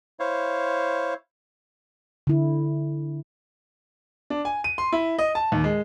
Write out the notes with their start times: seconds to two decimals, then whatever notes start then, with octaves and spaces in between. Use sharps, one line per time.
0.20 E4 C5 C#5 F5
2.27 D3 E4
4.30 D4
4.45 G#5
4.64 D#7
4.78 C6
4.92 E4
5.19 D#5
5.35 A5
5.52 D#2
5.64 G#3